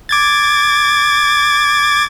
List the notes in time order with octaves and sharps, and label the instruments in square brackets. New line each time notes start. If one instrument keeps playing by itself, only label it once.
[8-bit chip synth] D6 G#6 A6